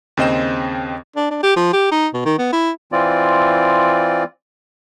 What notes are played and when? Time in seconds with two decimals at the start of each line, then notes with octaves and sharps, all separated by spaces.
0.17 D#2 C#3 C4 D#5 G5 E7
1.16 D4
1.31 D4
1.43 G4
1.56 F3
1.73 G4
1.91 D#4
2.14 B2
2.25 D#3
2.39 B3
2.53 E4
2.92 E3 C4 F4 D5